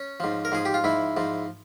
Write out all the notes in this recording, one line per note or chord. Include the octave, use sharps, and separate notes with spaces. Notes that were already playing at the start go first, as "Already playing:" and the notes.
Already playing: C#4
G#2 F3
A#4
G#2 F3 G#4
G4
F4
G#2 F3 E4
G#2 F3